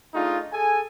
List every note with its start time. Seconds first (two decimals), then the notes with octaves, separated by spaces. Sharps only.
0.14 A3 D4 D#4 F4 G#4
0.53 G#4 A4 G#5